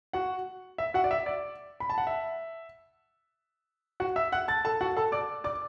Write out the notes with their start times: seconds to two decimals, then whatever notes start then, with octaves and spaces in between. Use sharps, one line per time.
0.13 F#4 F#5
0.78 E5
0.94 F#4 F#5
1.04 D5
1.11 E5
1.26 D5
1.80 B5
1.90 A5
1.98 F#5
2.07 E5
4.00 F#4 F#5
4.16 E5 E6
4.32 F#5 F#6
4.48 A5 A6
4.65 A4 A5
4.81 F#4 F#5
4.97 A4 A5
5.12 D5 D6
5.44 D5 D6